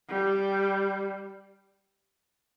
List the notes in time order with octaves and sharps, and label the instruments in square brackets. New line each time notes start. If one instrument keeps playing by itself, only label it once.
[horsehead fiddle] G3